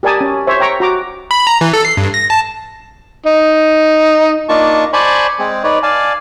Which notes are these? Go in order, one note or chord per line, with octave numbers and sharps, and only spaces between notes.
G4 A#4 D5 G#5 A5 D#6
C#4
C5 C#5 E5
G5 A#5 C#6
F#4 A#5 D6
B5
A#5
E3
A4
C7
G2
A#6
A5
D#4
A#3 D4 D#4 F4 A5 C#6
C5 D5 G#5 A5 B5 C#6
G#3 C4 G#4
D#4 B4 C#5 D5
D5 F5 G#5 A5